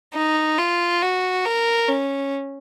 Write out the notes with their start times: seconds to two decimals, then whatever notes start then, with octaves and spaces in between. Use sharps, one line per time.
0.15 D#4
0.58 F4
1.02 F#4
1.45 A#4
1.89 C#4